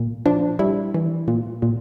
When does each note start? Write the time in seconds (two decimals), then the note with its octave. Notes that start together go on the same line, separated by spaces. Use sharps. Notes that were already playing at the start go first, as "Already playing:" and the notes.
Already playing: A#2
0.26 F3 D4
0.59 G3 E4
0.94 E3
1.28 A#2
1.62 A#2